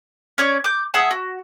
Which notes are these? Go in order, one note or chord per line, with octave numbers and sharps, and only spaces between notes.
C#4 C#5 D5
D6 G6
G#4 E5 F#5 A5
F#4